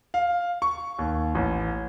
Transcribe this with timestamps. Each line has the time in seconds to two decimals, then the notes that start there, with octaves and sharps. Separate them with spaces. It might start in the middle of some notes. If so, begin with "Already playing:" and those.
0.14 F5
0.62 C#6
0.99 D#2
1.35 A1